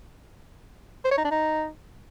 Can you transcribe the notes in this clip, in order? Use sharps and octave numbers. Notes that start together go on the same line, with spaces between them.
C5
C#5
D#4
D4
D#4